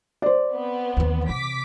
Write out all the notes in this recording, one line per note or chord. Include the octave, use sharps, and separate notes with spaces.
C5 D5
B3 C4
D#2 E3
C3 D6 B6